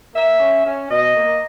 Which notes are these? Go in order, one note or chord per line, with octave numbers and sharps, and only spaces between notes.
A#3 E5
C#4
C#4
B2 D#5
A#3